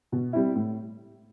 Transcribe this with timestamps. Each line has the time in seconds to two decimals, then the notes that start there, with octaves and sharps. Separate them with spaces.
0.12 B2
0.33 G3 C4 E4
0.55 A2